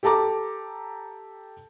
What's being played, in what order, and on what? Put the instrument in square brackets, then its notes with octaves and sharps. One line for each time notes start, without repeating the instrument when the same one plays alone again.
[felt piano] G4 A4 A5 A#5 D6